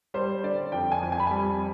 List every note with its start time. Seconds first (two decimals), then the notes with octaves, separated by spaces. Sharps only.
0.14 G3 C5
0.43 D3 D5
0.72 F2 G5
0.92 G#5
1.02 F2
1.12 G#5
1.20 B5
1.27 G3 G#5